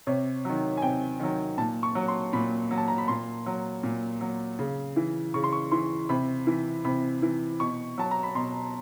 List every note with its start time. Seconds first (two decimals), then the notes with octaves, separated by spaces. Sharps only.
0.07 C3 C#5
0.45 D#3 F#3
0.77 G#5
0.82 C3 G5
1.20 D#3 F#3
1.58 A#2 A5
1.83 C#6
1.95 F#3
2.08 C6
2.33 A#2 B5
2.71 F#3
2.78 A5
2.88 A#5
2.98 B5
3.08 A#2 C6
3.46 F#3
3.83 A#2
4.21 F#3
4.59 C#3
4.96 E3
5.34 C#3 C#6
5.44 C6
5.53 C#6
5.72 E3 C6
6.09 C3 B5
6.47 E3
6.85 C3 B5
7.22 E3
7.60 B2 C#6
7.98 F#3 A5
8.11 A#5
8.23 B5
8.35 B2 C6